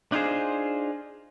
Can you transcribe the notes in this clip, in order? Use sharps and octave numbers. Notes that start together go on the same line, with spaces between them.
D4 D#4 F4 F#4 G#4 C5